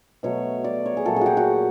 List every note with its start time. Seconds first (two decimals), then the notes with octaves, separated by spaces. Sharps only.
0.23 B2 F#3 A3 C#5
0.64 D5
0.86 C#5
0.97 G#4
1.05 A#2 F#3 A3 A4
1.16 G#4
1.21 F#4 G4
1.37 F#4